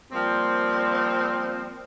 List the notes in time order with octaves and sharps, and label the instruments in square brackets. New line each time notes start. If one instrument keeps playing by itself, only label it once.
[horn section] F3 G3 A#3 C4